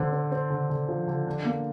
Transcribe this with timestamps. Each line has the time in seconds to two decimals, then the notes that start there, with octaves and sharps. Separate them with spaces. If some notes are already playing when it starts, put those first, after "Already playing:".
Already playing: D3 C4
0.12 C4
0.31 C4
0.50 D3
0.70 D3
0.89 F3
1.08 D3
1.27 D4
1.45 A#3